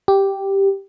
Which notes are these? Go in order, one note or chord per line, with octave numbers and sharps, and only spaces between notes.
G4